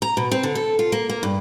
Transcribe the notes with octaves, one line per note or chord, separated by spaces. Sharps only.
A#5
B2
C4
D3
A4
F4
A#3
A#3
G2